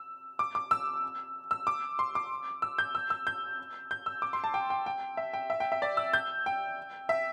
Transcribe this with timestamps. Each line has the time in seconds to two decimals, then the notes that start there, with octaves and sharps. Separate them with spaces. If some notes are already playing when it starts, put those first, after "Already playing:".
Already playing: E6
0.39 D6
0.55 D6
0.71 E6
1.51 E6
1.67 D6
1.99 C6
2.15 D6
2.62 E6
2.78 G6
2.95 E6
3.10 E6
3.27 G6
3.91 G6
4.06 E6
4.22 D6
4.33 C6
4.44 A5
4.54 G5
4.70 G5
4.86 G5
5.17 E5
5.33 G5
5.50 E5
5.60 G5
5.72 E5
5.82 D5
5.97 E6
6.14 G6
6.46 G5
7.09 E5